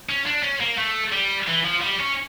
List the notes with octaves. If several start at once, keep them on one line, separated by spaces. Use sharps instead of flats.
C#4
D4
C#4
A#3
A3
G3
E3
F3
G3
C#4